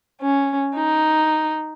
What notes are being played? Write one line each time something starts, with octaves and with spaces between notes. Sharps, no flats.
C#4
D#4